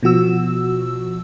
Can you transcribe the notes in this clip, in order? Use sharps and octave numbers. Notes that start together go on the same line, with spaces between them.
B2 F3 F#4 E6